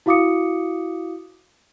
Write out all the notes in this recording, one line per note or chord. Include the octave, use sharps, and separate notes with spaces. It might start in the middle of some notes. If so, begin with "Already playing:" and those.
E4 F#4 F5 D6 D#6 C#7